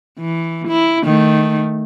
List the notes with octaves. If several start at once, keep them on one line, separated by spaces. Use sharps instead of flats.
E3
E4
D#3 A3